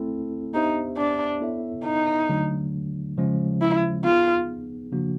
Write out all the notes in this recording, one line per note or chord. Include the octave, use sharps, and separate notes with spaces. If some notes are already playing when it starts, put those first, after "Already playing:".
Already playing: A3 C4 E4 A4
B3 D4 D#4 G4 C5 E5
D4
B3 E4 A4 C#5 E5
D#4
D3 F#3 A3 D4
C#3 F3 G#3 C#4
E4
B3 D#4 F4 G#4
C#3 F3 A#3 D4 F#4